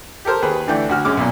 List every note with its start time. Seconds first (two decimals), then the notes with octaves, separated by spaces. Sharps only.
0.25 G4 A4 A#4 C5
0.42 D#2 G#4 B4
0.67 D3 E3 A3 D4 G5
0.89 D2 F#4 F6
1.05 F#2 G#3 D6 F6
1.17 B1 A#2